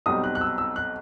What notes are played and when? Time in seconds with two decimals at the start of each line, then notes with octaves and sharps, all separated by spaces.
0.06 B1 B2 G3 C4 D#4 D#6
0.24 F#6
0.35 F#6
0.41 E6
0.58 E6
0.76 F#6